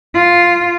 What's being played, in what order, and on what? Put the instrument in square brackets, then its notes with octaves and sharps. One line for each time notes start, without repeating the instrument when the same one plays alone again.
[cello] F4